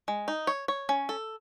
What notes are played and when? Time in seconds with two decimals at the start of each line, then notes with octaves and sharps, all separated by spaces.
0.08 G#3
0.28 D#4
0.47 C#5
0.68 C#5
0.89 C#4
1.09 A4